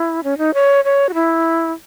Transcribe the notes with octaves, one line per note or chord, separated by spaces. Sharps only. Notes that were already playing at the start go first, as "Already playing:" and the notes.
Already playing: E4
C#4
D#4
C#5
C#5
F#4
E4